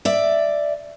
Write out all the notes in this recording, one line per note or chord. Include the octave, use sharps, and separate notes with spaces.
D5 E5